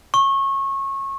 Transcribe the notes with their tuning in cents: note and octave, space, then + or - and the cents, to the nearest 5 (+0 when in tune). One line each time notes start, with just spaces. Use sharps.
C#6 -25